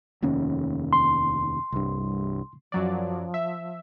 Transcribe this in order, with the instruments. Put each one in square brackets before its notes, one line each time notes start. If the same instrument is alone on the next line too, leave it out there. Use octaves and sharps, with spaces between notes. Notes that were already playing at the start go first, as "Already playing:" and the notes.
[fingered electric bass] F1 D#2 C#4
[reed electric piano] C6
[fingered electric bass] C2 G2
[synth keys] F#2 F#3 D5 [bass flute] F3
[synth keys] E5